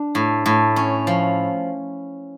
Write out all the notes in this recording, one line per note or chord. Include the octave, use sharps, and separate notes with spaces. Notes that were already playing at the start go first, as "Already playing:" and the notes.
Already playing: D4
A2
A2
C#4
F3